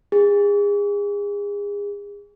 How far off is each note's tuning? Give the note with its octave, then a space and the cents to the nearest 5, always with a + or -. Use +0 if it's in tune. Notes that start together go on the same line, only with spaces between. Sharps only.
G#4 -30